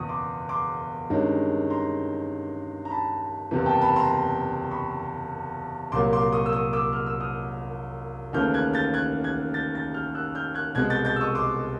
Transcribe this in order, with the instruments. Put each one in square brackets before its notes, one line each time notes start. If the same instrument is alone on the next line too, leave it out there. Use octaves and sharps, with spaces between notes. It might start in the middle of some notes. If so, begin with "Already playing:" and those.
Already playing: [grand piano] F#1 E2 B2 C#6 D#6
C6 D6
C6 D6
G2 D#3 G#3 C#4
A#5 C6
A#5
A5 B5
F#1 E2 C3 E3
G5 A5
A5 B5
A#5 C6
B5 C#6
C2 A#2 F#3 A#3 C6 D6
C6 D6
C#6 D#6
E6
C#6 D#6
D6 E6
F6
E6
D#6 F6
D#2 C#3 E3 A3 F6 G6
F#6 G#6
G6 A6
F#6 G#6
F#6 G#6
G6 A6
G6 A6
F6 G6
E6 F#6
F6 G6
F#6 G#6
C2 B2 G#3 C4 F#6 G#6
G6 A6
G6 A6
E6
C#6 D#6
C6 D6